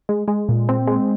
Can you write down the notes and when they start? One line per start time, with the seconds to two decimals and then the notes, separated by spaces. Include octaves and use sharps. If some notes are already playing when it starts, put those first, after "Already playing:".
0.09 G#3
0.28 G#3
0.49 A#2
0.69 C4
0.87 G#3